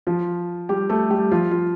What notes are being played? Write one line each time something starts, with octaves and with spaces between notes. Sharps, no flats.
F3 F4
G3 G4
A3 A4
G3 G4
F3 F4
F4